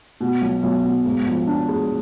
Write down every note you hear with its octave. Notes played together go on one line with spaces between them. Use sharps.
B2
B1
B1
B2
G#2
F3
D4
G#3